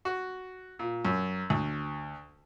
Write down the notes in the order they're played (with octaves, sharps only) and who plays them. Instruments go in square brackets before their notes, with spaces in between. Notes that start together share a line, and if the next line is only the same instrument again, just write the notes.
[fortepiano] F#4
A#2
F#2
D2